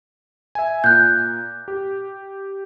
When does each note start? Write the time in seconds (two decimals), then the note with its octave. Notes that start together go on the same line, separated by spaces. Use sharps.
0.55 E5 G#5
0.84 A#2 F#6 G6
1.68 G4